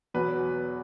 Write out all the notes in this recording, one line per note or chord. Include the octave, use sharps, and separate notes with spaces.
E2 B2 F#3 B4